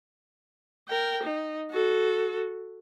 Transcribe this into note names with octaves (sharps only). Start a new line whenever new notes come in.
A#4 G5
D#4
F#4 A4